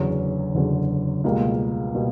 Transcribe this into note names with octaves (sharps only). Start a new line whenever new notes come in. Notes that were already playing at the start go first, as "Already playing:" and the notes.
Already playing: F#1 E2 D3 F#3 C#4
F#1 E2 D3 F#3 C#4
C#2 B2 G3 A#3
B2 G3 A#3